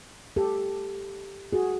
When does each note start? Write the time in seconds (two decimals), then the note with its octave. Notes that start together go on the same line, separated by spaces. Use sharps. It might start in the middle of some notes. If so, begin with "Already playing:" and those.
0.36 G4 A4
1.53 F#4 G#4